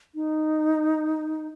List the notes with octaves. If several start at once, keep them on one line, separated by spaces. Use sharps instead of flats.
D#4